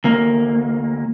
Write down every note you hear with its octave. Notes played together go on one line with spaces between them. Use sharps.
D2 A#3